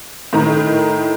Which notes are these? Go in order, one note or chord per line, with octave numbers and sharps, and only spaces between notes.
A2 D#3 A#5